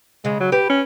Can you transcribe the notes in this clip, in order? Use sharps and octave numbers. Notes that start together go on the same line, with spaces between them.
C#3 G#3
F#3
G4 B4
C#4